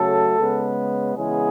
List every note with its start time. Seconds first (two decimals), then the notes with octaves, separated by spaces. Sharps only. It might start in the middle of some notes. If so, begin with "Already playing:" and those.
Already playing: C#3 F#3 A3 A4
0.39 C#3 G#3 B3
1.16 C#3 E3 G#3 B3 G#4